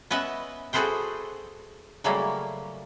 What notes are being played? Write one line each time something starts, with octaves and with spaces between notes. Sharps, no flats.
B3 C#4 B4 D#5 E5 F#5
F#4 G#4 A4 B4 C5 G5
C#3 F#3 G3 A3 A#3 C#4